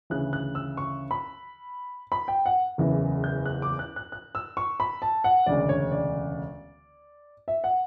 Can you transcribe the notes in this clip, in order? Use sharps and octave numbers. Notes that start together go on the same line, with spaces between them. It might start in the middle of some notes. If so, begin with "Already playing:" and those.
D2 C#3 E3 F#6
F#6
E6
C#6
B5
B5
G5
F#5
F#1 E2 C#3 E3
G6
F#6
D6
F#6
F#6
F#6
E6
C#6
B5
A5
F#5
E1 D2 C#3 D5
C#5
D5
E5
F#5